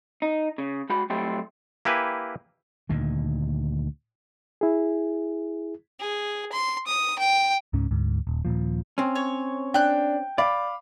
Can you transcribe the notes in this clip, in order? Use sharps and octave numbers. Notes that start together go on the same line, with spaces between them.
D#4
C#3
G#3 F#4 B5
F#3 G3 A3 C4 E4 G4
A#3 E4 G4 B4 G#5
D2 A#2 D#3
E4 G#4
G#4
C6
D#6
G5
C#2 G#2 C#4
D2 G#2
D#1
D#1 A#1 A#2 F3
C4 C#4
C#5
D4 G5 F#6
D5 F5 B5 D6